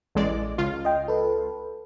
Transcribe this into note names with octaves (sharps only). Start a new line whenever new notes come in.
A1 G#3 D5
C#2 F4
D#5 G5
A4 B4